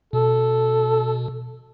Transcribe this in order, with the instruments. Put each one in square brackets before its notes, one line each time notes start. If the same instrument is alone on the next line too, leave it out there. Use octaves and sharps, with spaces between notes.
[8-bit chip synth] B2 [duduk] A4